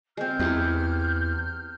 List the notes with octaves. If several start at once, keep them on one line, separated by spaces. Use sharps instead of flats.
G#3 C4 F6 G6
E2 E4 G4 G#4